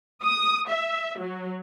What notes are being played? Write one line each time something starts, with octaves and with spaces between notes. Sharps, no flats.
D#6
E5
F#3